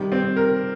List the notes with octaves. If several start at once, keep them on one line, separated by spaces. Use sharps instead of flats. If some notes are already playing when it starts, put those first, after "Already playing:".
Already playing: C3 D#3 G3
C4
A#4